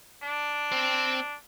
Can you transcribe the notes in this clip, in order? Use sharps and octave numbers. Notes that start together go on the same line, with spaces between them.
D4
C4 C5